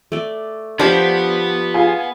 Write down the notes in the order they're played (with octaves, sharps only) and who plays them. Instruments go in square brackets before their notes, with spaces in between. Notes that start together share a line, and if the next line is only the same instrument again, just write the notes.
[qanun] A3 D5
[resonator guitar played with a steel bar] F3 G4 [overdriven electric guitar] B3 [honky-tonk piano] D4 [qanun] C5 C#5
[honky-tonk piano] F4 G#4 G#5